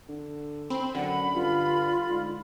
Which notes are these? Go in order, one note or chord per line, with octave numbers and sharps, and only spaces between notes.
D3
C4 B5
F#2 D3 F#5
G2 F4
G#2